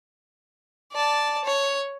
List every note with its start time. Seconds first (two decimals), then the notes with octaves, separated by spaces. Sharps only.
0.92 D5 A5
1.45 C#5